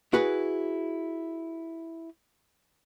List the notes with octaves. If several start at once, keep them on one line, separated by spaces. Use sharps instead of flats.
E4 F#4 G#4 B4